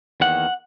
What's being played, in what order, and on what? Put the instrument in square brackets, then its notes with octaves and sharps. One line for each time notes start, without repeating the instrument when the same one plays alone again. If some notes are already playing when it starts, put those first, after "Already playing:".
[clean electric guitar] E2 D#3 A#3 F#5